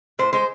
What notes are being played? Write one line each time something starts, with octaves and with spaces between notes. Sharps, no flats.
A2 C5
G#3 C5